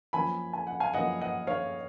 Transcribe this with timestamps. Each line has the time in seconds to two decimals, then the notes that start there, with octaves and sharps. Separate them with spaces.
0.13 F#2 F3 A#3 G#5 B5
0.53 G#5
0.67 F#5
0.80 F5 G#5
0.94 F#2 F3 A#3 D#5 F#5
1.21 D#5 F#5
1.47 C#5 F5